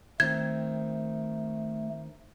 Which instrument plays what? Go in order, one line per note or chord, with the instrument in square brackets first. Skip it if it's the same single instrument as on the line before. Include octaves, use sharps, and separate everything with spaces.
[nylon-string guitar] D#3 C4 [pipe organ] A3 [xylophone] G#6